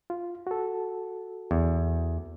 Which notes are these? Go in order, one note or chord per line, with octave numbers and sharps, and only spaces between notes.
F4
F#4 A4
E2